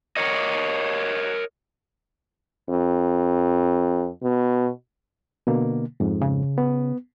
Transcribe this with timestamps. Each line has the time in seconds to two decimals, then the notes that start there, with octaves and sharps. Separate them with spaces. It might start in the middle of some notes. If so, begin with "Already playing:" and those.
0.17 A#4 C#5 D#5
2.69 F2
4.23 B2
5.47 B2 D3 A#3
6.00 F2 G#2
6.21 C#3
6.58 B3